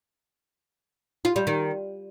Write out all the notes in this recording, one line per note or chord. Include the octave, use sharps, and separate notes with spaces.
F4
G3
D#3